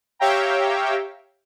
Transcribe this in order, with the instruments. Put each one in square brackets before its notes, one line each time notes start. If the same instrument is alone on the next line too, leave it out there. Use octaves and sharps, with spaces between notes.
[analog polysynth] G4 C#5 E5 F5 G5 A#5